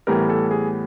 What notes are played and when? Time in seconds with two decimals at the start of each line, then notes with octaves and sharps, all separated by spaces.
0.07 A2 E3 G3 B3 A#4
0.30 A4
0.51 G#4